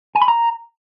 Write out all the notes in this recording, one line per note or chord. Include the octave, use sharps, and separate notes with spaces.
G#5
B5
A#5